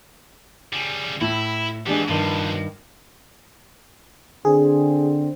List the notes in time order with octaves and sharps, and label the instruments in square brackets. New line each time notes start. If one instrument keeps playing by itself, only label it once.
[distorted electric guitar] C#3 G3
[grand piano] A2 [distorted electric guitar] E4
[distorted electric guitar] E3 B3 [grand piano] G#3 D4 G4
[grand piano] G2 D#3 [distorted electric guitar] B2 F3
[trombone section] D3 C4 [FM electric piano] G#4